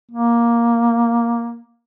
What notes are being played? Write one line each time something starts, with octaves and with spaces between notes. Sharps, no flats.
A#3